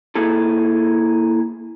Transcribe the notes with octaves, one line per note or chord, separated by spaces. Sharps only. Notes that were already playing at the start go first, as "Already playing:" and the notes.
A#3 E4 G#4 A4